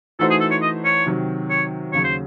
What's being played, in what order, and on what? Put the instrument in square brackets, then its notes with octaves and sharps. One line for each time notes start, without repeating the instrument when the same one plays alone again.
[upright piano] E3 A3 D#4 F#4 C5 [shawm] A4
[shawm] G#4
A4
C#5
D#5
C#5
[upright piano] C3 D#3 F#3
[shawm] C#5
[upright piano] D#2 C#3 F#3 [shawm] C#5
[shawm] C5